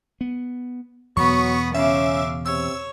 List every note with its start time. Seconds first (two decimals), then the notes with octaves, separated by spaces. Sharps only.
0.21 B3
1.17 E2 B2 F#3 B3 B5 C#6 D#6
1.74 C#3 C#4 E5 F5 D6
2.46 C3 C#5 E6